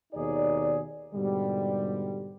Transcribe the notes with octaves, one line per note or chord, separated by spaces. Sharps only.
D#2 B2 D#4 G#4 D5
G#2 B2 D3 G3